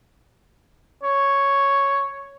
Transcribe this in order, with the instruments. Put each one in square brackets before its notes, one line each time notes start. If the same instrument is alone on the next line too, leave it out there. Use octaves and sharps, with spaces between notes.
[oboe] C#5